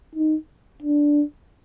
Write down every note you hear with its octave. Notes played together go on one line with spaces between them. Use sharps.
D#4
D4